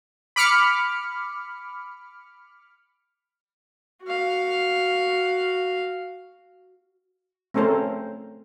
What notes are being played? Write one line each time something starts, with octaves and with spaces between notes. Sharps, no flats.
B5 D6 F6 C#7
F#4 F5
A3 C4 C#4 A4 A#4 C5